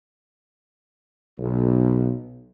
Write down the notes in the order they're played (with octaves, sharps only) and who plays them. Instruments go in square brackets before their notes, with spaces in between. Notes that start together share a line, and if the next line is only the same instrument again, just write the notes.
[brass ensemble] B1